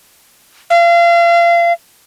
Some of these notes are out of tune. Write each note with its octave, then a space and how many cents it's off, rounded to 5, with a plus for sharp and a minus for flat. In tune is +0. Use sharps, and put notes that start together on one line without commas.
F5 -30